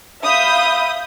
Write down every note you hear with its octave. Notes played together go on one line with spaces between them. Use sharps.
E5 F5 B5 D#6 G6